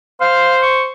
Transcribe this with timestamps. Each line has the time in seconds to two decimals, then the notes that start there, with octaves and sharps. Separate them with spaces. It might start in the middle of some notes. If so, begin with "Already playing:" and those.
0.21 C5 F5
0.63 C#6